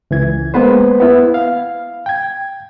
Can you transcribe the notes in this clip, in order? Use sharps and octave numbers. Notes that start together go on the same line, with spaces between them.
C#2 E3 G#6
G#3 A#3 B3 B4 C5
B3 E4
F5
G5 G#6